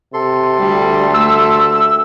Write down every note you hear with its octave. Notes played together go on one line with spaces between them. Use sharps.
C3 A4 C6
D2 G3
A3 E6